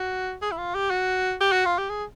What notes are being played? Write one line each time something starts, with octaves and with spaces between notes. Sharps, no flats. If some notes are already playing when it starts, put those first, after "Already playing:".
Already playing: F#4
G#4
E4
F4
G4
F#4
G4
F#4
F4
G4
G#4